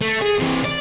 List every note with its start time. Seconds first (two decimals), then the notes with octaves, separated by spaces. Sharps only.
0.02 A3
0.22 G#4
0.40 C3 E3
0.66 D5